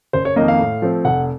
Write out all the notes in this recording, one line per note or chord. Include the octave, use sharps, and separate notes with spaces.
F#1 C5
C#5
F2 D#3 A#3 D#5
F5
A2
F3 A3 C4
F1 F#5